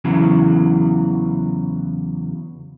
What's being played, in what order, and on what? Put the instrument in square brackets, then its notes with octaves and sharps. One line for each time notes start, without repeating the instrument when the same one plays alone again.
[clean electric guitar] E2 C#3 E3 F#3